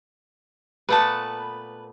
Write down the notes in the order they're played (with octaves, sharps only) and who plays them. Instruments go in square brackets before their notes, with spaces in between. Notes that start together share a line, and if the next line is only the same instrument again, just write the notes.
[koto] A#2 A3 B3 [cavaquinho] B4 A5